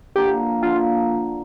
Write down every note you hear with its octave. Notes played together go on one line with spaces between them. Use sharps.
D3 F3 A#3 G4
D3 F3 A#3 F4